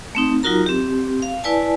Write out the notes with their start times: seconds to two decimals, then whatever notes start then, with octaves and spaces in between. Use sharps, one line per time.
0.15 A3 C4 D#4
0.43 F#3 D#4 F4 F#4 A#4 A#5
0.66 C4 G4
1.22 F5
1.44 E4 B4 D5 G#5 A5